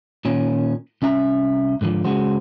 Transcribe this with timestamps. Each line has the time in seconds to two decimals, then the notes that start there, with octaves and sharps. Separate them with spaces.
0.25 A#2 D#3 C#4
1.02 C2 C#4 E5 A#5
1.81 G#2 D3 D#3 F3
2.05 C#3 G#3 F#4 C5